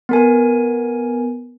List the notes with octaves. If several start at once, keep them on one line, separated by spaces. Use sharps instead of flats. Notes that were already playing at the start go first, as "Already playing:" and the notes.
B3 A#4 G#5